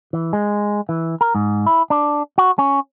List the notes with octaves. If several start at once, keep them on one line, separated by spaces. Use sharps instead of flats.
E3
G#3
E3
A#4
G#2
E4
D4
F#4
C#4